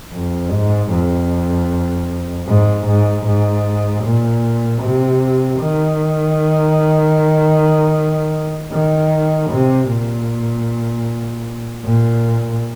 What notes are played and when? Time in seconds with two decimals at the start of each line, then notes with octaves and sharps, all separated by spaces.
0.14 F2
0.52 G#2
0.92 F2
2.47 G#2
2.86 G#2
3.26 G#2
4.04 A#2
4.82 C3
5.59 D#3
8.72 D#3
9.50 C3
9.89 A#2
11.84 A#2